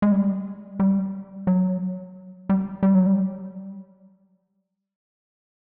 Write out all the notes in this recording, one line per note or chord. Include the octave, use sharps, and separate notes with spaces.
G#3
G3
G3
F#3
G3
G3
F#3
G3